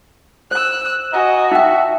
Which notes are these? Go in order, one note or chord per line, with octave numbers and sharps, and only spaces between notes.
C5 E6 F#6
F#4 D#5 G#5 A#5
D#4 E5 G5